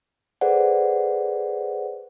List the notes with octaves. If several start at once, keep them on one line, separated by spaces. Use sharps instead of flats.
G#4 A4 B4 C5 D5 F#5